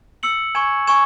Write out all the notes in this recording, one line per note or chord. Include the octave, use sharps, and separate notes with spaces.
E6 C#7 F#7
G#5 C#6 G#6 E7
G#5 C#6 G#6 E7